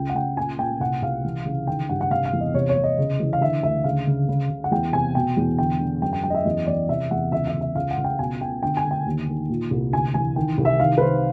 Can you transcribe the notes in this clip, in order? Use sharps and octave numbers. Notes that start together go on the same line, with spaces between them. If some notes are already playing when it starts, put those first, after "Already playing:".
Already playing: C#2 G5
F#5
C#2 G5
A#2 G#5
A#2 G5
C2 F#5
C2 F5
E3
C#3
D#3 G5
G2 F#5
F#5
C3 F5
F5
E2
D#5
C3 C#5
C#5
C3
D#5
C#3
E3
F5
D3 E5
D2 E5
C#3 F5
C#3
C#3
C#3
F#5
E2 G5
C3 G#5
B2 G5
E2
D3 G5
D3
F#2 G5
G5
F#2 G5
D#5
E5
E2 D#5
E3 D5
C3 E5
E2 F#5
C#2 E5
E5
C#2
E5
C#2 F5
F#5
C#2
G5
B2 G#5
B2 G5
D3 G5
G#5
D3
G5
D#2
D#3
A#2
C2
D2 G#5
E3 G#5
D#3 G5
C2
E5
D#3 F5
B4
D#3 C5